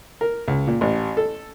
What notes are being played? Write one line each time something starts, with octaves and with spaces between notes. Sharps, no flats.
A#4
C#2
A#2
A1
A4